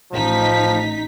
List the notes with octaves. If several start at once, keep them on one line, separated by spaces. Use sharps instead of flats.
A1 F3 D#4 B6